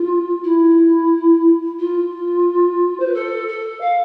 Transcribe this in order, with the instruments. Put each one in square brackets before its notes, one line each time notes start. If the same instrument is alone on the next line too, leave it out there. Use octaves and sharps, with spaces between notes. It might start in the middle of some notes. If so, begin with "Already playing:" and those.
Already playing: [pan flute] F4
E4
F4
C5
B4
A4
A4
F5